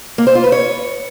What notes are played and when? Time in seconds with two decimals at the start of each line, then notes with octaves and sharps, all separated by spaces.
0.18 A#3
0.27 C5
0.35 F4
0.44 B4
0.52 C#5